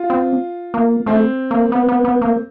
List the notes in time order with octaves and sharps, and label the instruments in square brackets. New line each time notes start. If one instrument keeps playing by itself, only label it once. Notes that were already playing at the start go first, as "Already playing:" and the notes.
Already playing: [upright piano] F4
[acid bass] C4
A#3
[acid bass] A3 [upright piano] C4
[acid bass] A#3
B3
B3
B3
A#3